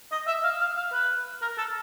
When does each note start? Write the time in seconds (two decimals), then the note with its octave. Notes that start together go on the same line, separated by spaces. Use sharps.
0.12 D#5
0.27 E5
0.44 F5
0.61 F5
0.77 F5
0.93 B4
1.42 A#4
1.58 A4